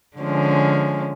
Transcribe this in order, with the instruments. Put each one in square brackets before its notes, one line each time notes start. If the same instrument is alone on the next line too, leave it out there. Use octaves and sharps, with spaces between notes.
[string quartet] D3 F3 G#3 C#4